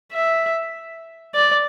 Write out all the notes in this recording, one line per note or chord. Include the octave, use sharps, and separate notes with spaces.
E5
D5